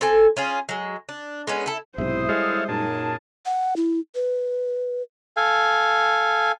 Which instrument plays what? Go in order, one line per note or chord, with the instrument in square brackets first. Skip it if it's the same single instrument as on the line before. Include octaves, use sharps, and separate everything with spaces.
[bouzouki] C4 A4 G#5
C#4 F4 G#4
F#3 G#3
D4
G#3 B3 C#4
E4 A4
[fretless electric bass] B1 G#2 C3 [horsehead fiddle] E4 C5 [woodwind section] E5 D#6
[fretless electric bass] G3 G#3 [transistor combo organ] A4 C#5 F5
[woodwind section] F#2 A5 [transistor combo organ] A#2 G#4 [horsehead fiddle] D#4
[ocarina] F#5
E4
B4
[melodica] A4 F5 G#5